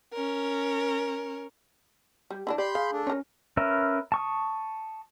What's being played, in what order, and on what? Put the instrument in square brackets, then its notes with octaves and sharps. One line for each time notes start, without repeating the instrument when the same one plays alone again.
[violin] C#4 A#4
[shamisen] G3
D3 E3 D4
[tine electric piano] G4 [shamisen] D5 [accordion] B5 C6 G6
[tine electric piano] G#4 [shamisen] F5
[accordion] A3 D4
[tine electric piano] C#4 [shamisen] A#4 C#5
[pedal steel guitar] C#4 A#4 B4 E5
A5 C#6 D#6